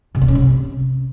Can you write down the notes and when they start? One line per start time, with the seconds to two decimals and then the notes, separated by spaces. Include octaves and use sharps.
0.15 C3
0.21 A#3
0.28 C#4
0.35 C3